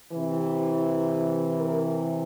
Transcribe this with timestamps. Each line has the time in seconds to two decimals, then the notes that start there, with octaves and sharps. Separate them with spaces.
0.12 C3 E3
1.60 A#4